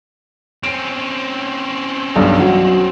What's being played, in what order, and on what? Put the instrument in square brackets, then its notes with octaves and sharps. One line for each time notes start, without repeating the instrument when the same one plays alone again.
[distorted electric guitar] C4 C#4 [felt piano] D7
[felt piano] B1 G2
F#3